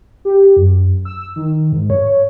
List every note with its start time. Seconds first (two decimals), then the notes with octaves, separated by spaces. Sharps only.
0.25 G4
0.56 F#2
1.05 E6
1.36 D#3
1.72 G#2
1.90 C#5